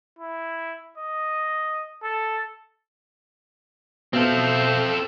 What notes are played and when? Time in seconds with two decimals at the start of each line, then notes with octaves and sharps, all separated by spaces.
0.19 E4
0.98 D#5
2.03 A4
4.13 B2 C4 A4 C5 E5 F5